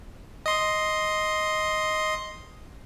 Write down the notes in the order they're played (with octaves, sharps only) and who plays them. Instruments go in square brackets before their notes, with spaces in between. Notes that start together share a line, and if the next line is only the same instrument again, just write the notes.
[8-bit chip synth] D#5 C6